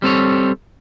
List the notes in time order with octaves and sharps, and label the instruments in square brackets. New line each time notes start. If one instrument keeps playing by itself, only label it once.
[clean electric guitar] G3 C4 A4 C#5